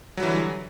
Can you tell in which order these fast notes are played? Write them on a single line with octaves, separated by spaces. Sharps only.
F#3 G3 E3 D3